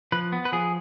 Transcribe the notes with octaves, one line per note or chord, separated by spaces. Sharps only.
F3 B4
B3
B4
F3 G#4